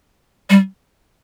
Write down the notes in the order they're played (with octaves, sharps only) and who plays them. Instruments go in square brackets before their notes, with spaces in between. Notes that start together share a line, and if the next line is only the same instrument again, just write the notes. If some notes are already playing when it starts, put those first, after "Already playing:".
[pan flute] G3